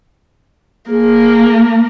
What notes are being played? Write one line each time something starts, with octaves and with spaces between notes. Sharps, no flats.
A#3 G#4